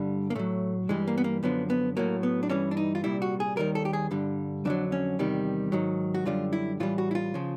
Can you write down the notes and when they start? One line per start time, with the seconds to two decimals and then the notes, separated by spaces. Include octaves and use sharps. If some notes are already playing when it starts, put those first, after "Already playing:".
Already playing: G2 D3 G3
0.30 A#3
0.35 A2 F#3 A3
0.89 G2 E3 G3 G#3
1.07 A#3
1.18 B3
1.24 A#3
1.43 F#2 D3 F3 B3
1.70 B3
1.97 A2 F#3 A#3
2.23 B3
2.43 D4
2.49 G2 E3 G3 C#4
2.71 D4
2.77 D#4
2.95 F4
3.04 C2 A#2 G3 E4
3.22 F#4
3.40 G#4
3.57 D#2 D#3 G3 A#4
3.75 A4
3.85 G4
3.93 G#4
4.11 G2 D3 G3
4.65 F2 D3 F#3 D4
4.92 C#4
5.19 E2 C3 D#3 G3
5.72 G#2 D#3 F#3
6.14 F#4
6.26 F#2 D3 G3 F4
6.53 E4
6.80 A2 E3 G3 F4
6.98 F#4
7.11 E4
7.15 F4
7.34 C#3 F3